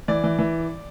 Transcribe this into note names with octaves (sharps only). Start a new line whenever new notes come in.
E3 D5
E3
E3